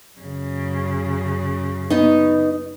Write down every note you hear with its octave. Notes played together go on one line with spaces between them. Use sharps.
F#2 C#3
B3 D#4